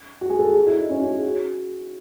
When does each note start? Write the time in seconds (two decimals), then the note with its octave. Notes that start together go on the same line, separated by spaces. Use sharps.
0.21 F#4
0.30 G#4
0.39 A4
0.48 G#4
0.55 F#4
0.67 E4
0.77 D#4
0.90 C#4
1.00 F#4
1.12 G#4
1.23 F#4